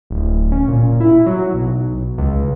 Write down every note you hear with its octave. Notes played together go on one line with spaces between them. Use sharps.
D1
C#4
A#2
E4
F#3
B1
C#2